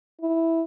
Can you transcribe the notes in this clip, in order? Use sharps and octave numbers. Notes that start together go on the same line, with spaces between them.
E4